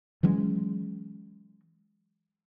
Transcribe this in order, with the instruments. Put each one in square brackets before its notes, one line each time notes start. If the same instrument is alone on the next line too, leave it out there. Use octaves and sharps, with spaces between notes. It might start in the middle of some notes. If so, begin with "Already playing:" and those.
[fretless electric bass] E3 F#3 G#3 C#4